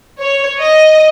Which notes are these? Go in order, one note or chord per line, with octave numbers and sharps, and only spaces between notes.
C#5
D#5